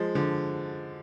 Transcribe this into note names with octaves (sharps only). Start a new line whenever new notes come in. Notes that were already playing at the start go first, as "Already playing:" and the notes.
Already playing: F3 G#3
D3 F3